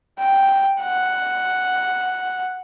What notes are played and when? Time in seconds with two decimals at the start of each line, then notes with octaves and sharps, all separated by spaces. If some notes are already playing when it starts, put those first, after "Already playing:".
0.19 G5
0.82 F#5